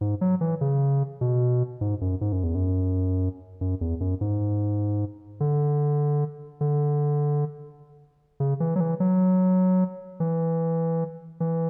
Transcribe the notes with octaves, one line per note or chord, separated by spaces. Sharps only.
G#2
F#3
E3
C#3
B2
G#2
F#2
G#2
F#2
E2
F#2
F#2
E2
F#2
G#2
D3
D3
C#3
E3
F#3
E3
F#3
E3
E3